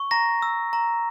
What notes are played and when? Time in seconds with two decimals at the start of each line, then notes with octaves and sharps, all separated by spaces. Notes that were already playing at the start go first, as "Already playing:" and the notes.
Already playing: C#6
0.11 A#5 A#6
0.42 E6
0.73 A#5